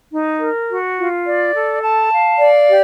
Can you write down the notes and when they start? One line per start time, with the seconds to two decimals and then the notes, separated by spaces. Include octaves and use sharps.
0.12 D#4
0.40 A#4
0.70 F#4
0.98 F4
1.26 D5
1.55 A4
1.83 A5
2.12 F5
2.40 D5
2.69 G4